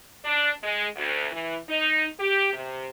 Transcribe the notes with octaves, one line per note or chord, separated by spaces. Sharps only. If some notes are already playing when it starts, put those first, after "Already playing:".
D4
G#3
D2
E3
D#4
G4
C3